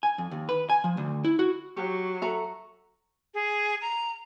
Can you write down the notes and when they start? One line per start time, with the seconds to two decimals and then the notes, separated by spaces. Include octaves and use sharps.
0.03 G#5
0.18 F2
0.31 D#2
0.49 B4
0.70 G#5
0.84 F3
0.97 D2
1.24 E4
1.39 F#4
1.77 F#3 G4 C#6
2.22 F#4 A4 E5 A#5
3.34 G#4
3.82 A#5